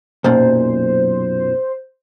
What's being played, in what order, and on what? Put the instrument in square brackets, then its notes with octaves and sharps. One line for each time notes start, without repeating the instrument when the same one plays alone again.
[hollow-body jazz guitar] B1 F#2 A#2 [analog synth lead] C5